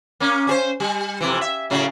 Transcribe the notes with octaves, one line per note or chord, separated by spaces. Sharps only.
A#3 C#4
C#4 G#4 C5
G3
F2 C3 E3
E5
A2 C#3 F#3